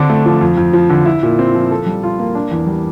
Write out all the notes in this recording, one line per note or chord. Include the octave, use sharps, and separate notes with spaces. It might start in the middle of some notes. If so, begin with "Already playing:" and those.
Already playing: D3 C4 D4
A3
F3
F2
F2
F3
D3
E4
A#2
C4
F3
A4
G3
F4
A#3
D4
E2
G3